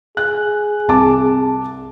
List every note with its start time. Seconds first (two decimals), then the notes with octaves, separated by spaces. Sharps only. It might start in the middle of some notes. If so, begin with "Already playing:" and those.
0.17 G#4 F#6
0.88 C2 A5 D6